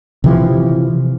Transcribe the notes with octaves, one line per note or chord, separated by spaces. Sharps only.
C3 E3 F3